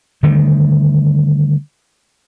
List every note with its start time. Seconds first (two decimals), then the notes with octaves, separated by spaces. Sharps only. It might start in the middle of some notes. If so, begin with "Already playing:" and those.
0.23 D3 D#3 G3 A3